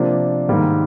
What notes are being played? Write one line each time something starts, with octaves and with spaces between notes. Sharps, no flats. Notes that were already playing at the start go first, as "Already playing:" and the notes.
Already playing: C3 F3 A#3 D4
G#2 D#3 G3 A#3